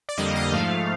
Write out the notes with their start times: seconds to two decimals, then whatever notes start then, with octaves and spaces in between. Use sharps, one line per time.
0.09 D5
0.18 F2 D3 G3 A#3 D#5
0.35 F5
0.53 G#2 F3 A3